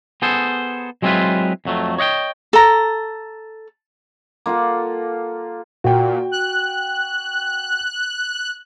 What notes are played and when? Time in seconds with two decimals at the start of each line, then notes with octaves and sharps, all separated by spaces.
0.22 B3 G#4 A4 C5
1.02 F#3 G#3 C4 E4 F4 B4
1.65 F2 F#3 A3
1.98 C#5 D#5 F#5 G5
2.53 A4 A#5
4.46 A#3 F4 A4 F#5
5.84 A#2 F#4 G5
6.31 F#6